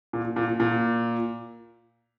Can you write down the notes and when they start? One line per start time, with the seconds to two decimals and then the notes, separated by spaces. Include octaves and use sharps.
0.13 A#2
0.36 A#2
0.60 A#2